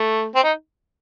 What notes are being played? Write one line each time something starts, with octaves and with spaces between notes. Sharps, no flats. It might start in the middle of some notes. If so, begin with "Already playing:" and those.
Already playing: A3
C4
D#4